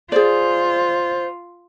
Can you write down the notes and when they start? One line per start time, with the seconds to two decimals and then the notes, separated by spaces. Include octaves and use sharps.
0.12 F4 G#4 C5 D5